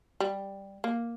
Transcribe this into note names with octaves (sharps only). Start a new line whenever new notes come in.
G3
A#3